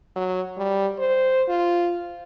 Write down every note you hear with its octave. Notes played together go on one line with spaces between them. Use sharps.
F#3
G3
C5
F4